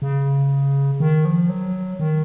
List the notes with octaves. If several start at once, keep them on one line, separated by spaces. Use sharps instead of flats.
C#3
D#3
F3
F#3
D#3